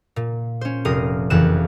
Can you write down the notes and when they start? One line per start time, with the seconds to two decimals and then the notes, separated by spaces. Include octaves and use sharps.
0.16 A#2
0.61 C#4 C5
0.85 F1 A#4 D#6 C7
1.30 F#1 F2 E3 F#6 E7